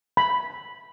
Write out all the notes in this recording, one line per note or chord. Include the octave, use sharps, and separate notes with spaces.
B5